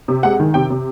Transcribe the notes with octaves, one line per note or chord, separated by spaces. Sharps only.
C3
G#3 F#5
D#3
C3 G5
C3